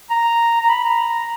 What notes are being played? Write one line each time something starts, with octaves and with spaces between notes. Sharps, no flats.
A#5
A#5
B5
A#5